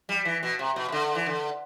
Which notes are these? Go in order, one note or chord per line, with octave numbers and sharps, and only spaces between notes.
G3
E3
B2
C3
B2
C3
D3
E3
D3